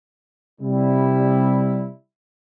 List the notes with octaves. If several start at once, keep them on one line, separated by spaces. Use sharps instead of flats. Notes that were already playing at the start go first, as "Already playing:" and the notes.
C3 G3 E4